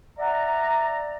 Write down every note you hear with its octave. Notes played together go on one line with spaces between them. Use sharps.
D5 E5 F#5 A#5